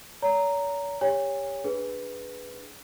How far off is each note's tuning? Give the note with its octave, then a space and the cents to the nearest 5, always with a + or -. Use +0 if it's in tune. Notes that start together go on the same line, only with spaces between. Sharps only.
C#5 +45 A#5 -5
G4 +20 C#5 +5 G#5 -40
D4 +0 G#4 +0 B4 +0